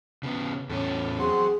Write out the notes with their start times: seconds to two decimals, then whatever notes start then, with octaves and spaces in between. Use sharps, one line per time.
0.23 C#3 B3
0.69 E2 A2 C#4
1.19 F#3 C4 G#4